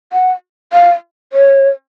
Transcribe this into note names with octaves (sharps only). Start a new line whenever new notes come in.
F#5
F5
C#5